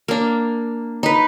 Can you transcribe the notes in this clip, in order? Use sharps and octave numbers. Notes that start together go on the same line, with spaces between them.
A#3 D4
D#4 B4